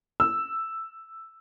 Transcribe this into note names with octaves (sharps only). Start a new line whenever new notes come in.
E6